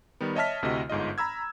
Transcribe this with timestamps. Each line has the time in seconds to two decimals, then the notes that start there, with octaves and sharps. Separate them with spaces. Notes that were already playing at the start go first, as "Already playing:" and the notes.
0.21 D#3 G3 B3
0.36 C#5 D#5 E5 A5 F6 B6
0.62 D2 C3 A3 E4 F#4 D#5
0.90 G1 G#2 F4 D#5
1.18 A#5 B5 E6 G#6